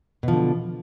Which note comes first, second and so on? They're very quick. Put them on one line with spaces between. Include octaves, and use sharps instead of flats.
B2 F3 D3